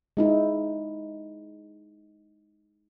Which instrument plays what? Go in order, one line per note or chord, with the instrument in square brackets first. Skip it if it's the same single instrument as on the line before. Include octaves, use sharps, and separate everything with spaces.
[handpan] G#3 D#4 E4